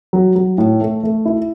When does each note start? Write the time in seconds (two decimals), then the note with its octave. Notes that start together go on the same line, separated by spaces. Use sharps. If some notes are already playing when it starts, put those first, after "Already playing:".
0.13 F#3
0.36 F#3
0.58 A2
0.81 A3
1.03 A3
1.25 E4